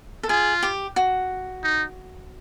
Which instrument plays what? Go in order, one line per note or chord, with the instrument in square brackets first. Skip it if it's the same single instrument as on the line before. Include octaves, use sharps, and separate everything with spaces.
[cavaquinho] A4
[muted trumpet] F4 [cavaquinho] G#4
[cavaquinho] G4
F#4
[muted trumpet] D#4